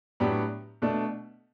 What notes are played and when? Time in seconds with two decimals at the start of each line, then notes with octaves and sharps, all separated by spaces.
0.20 A2 F#3 B3 D4 G4
0.82 B2 A3 D4